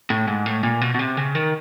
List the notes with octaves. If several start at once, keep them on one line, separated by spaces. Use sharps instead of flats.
A2
G#2
A2
A#2
B2
B2
C3
C#3
D#3